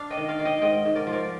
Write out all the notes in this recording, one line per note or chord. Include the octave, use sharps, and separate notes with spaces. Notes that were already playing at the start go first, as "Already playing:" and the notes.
Already playing: D4 F5
D#5 G5
D#3
D5 F5
D#3
D#5 G5
G#2 D#5 G5
G#2
A#4 D5
F3
A#4 D5